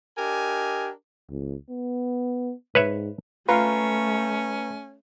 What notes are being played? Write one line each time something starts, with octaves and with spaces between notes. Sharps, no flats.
D4 G4 A#4 D#5 G#5
C#2
B3
G#2 B4 C#5 E5
A3 C#4 F4 B4 A#5